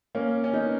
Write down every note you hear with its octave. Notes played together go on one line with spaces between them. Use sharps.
A#3 C#4
C#4
B3 D#4